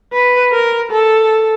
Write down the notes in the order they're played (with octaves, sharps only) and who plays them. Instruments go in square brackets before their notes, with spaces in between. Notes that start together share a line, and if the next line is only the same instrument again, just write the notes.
[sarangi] B4
A#4
A4